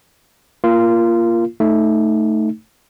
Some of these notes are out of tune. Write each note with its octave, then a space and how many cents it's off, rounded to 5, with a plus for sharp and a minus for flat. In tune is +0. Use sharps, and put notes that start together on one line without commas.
A#3 +0 F4 -20 A#4 +10
A3 +0 D#4 +5